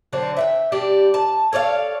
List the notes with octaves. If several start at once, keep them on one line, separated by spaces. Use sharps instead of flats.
D3 F#3 C4 D4
E5 F#5 G5
G3 D4 G4
A5
A4 C#5 D5 F5